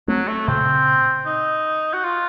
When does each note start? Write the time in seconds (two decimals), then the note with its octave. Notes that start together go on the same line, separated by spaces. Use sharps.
0.08 F#3 A3 C4
0.28 A3
0.48 A#2 C#3 C4
1.26 D#4
1.94 F#4
2.04 F4